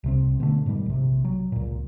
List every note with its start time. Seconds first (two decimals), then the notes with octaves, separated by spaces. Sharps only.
0.04 C2 C3 C4
0.40 B2 D3 A3
0.66 G#2 B2 D#3 G3
0.86 A#1 C3
1.25 F#3
1.52 C#2 A#2